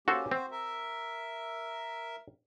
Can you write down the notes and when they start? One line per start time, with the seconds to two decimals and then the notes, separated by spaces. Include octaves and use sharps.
0.08 A#3 C#4 F#4 G4 A4 C5
0.31 C4 F#4 C5
0.51 A#4 E5